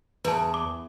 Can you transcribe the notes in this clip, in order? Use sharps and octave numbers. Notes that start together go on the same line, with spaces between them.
E2 B4 A5
D6